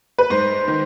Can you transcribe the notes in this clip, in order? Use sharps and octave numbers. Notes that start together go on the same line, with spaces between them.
B4
G#2 C5
D#3